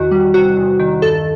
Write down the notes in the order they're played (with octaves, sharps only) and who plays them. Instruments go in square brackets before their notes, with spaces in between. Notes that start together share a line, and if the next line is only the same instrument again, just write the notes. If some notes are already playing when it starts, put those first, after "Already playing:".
Already playing: [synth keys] E2 D#3 F#4
G3
C3 F#4
E2
D#3
G2 A4